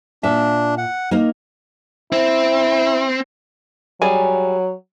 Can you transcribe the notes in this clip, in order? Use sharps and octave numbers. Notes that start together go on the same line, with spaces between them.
A#2 D4 E5
F#5
A#3 D#4 A#4
C4 E4
F#3 G3 G#4 G#5